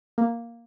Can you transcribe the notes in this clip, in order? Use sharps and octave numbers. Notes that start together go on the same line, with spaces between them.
A#3